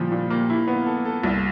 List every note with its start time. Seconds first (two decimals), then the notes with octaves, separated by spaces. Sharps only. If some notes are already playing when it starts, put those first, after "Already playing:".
Already playing: A#2 F3 G3
0.12 A#2
0.30 A#3
0.50 E4
0.67 B3
0.86 A4
1.05 A4
1.24 C2